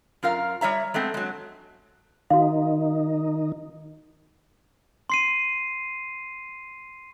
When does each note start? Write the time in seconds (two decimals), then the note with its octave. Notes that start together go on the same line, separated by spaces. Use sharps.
0.23 F#2 F4 A#4 F5
0.61 G3 C#5 E5 A#5
0.94 G#3 A3 B3 C4
1.14 F#3 G#3
2.30 D#3 D#4 F#4 F5
5.10 C6 C7 D#7